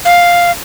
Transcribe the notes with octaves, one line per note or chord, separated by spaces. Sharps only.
F5